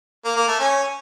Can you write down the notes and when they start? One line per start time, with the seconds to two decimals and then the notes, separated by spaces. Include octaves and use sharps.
0.25 A#3
0.36 A#3
0.48 A3
0.60 C#4